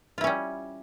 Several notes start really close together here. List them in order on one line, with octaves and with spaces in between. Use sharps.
F4 E4 C#4 G3